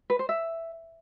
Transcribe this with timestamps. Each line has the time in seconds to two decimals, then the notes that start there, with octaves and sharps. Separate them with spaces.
0.10 B4
0.19 C5
0.29 E5